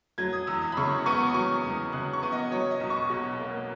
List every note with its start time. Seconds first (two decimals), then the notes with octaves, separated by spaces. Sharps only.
0.18 F#3 G#6
0.33 D#6
0.47 E2 E6
0.62 D#6
0.72 B5
0.77 C#3 C#6
1.06 B3 C#6
1.28 D#6
1.34 F#3 C#6
1.63 E2 D#6
1.93 C#3 F#6
2.13 C#6
2.23 B3
2.32 D#5
2.51 F#3 C#5
2.71 D#5
2.80 B1
2.90 C#6
3.10 B2
3.39 A#3